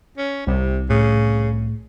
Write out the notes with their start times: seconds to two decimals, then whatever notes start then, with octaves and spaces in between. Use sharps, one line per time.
0.18 C#4
0.47 C2 C3
0.90 A2 C#3